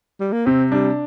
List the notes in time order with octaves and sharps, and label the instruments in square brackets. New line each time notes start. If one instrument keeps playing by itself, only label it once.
[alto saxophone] G3
A#3
[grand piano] C3 [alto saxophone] C4
[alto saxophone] G3 [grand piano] D4